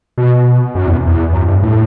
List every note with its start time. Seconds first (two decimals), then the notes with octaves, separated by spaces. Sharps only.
0.18 B2
0.75 F#2
0.86 E2
1.07 E2
1.33 F#2
1.48 G2
1.62 A2